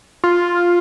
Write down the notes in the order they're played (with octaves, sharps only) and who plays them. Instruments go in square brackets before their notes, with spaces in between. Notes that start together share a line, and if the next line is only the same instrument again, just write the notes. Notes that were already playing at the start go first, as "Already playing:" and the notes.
[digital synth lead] F4